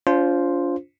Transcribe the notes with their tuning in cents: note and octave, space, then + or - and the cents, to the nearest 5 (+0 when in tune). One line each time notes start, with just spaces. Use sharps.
D4 -45 F4 +0 C5 +0